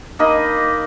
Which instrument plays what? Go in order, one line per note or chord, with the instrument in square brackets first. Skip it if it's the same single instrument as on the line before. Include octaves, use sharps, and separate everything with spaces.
[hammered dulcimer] A#3 D#4 D#5 B5